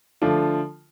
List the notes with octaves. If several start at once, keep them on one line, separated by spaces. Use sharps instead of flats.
D3 F3 A3 D4 F4